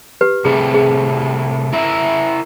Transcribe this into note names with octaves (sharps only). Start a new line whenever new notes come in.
G4 B4
C3 G3 A3 G#4
G#4
E4 A#4 E5